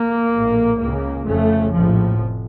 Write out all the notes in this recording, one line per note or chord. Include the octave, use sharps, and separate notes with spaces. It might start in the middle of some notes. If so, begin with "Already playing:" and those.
Already playing: A#3
A#1 A2
C#2 C#3 A#3
F1 F2 C#3 A3
A#1 A2 F3
F1